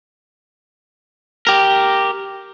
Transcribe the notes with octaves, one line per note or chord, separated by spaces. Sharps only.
G4 A#4